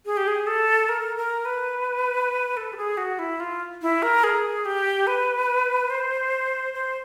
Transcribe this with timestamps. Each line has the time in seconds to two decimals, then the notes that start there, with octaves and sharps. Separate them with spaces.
0.06 G#4
0.17 G4
0.28 G#4
0.47 A4
0.89 A#4
1.17 A#4
1.45 B4
2.57 A4
2.73 G4
2.77 G#4
2.97 F#4
3.19 E4
3.40 F4
3.82 E4
4.03 A#4
4.24 G#4
4.65 G4
5.07 B4
5.90 C5
6.74 C5